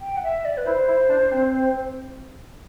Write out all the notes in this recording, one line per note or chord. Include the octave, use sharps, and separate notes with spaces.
G5
F#5
E5
D5
B4
E4 C5
E4
D4
C4